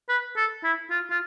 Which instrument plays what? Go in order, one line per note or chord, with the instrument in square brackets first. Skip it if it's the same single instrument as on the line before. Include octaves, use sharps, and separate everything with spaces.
[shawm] B4
A4
E4
F4
F4